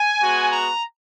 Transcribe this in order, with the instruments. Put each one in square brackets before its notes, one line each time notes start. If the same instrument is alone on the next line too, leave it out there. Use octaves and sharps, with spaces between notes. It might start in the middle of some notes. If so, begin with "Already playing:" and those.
Already playing: [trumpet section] G#5
G#3 B3 F#4
A#5